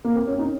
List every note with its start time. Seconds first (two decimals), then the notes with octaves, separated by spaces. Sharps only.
0.05 A#3
0.16 C4
0.27 C#4
0.39 D#4